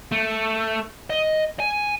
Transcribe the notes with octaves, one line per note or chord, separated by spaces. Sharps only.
A3
D#5
G#5